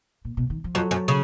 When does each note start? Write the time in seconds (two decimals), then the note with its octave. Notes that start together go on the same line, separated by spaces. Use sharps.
0.25 A#2
0.37 B2
0.50 D#3
0.64 F3
0.75 F2 F#3
0.91 F#2
1.08 C#3